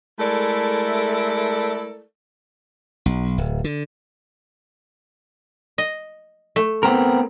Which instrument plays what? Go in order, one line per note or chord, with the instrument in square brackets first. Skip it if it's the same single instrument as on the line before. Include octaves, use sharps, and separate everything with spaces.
[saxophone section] G#3 A3 E4 A4 A#4 D5
[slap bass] B1
D1
D3
[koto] D#5
A3
[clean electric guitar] B3 C4 A#4